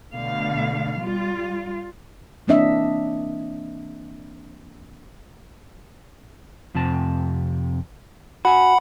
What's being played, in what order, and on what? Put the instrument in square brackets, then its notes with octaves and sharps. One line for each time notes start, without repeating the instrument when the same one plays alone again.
[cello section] B2 D3 A3 F5
G3 F4
[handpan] E3 A#3 C4 D4 D#5 E5
[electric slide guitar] F2 C3 A5
[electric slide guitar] F#4 G#5 [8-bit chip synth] F#5 B5